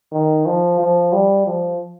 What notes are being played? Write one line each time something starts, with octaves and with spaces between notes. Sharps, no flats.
D#3
F3
F3
G3
F3